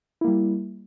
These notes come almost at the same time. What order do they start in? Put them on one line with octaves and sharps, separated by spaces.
E4 A#3 G3